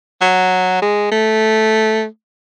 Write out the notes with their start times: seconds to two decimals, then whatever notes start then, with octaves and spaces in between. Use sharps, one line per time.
0.21 F#3
0.82 G#3
1.12 A3